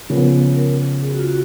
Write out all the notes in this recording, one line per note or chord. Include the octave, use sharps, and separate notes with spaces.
C#3 F3 B3 A#4
A#4
G#4
F#4
F4
F#4